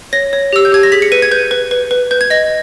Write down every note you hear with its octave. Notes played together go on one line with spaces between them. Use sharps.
C#5 A#6
C#5
G4 E6
G6
G4 G#6
A#6
G#4 B6
C#7
B4 D#7
G#6
B4 G6
B4
B4
B4
B4 G6
G#6
D#5 A#6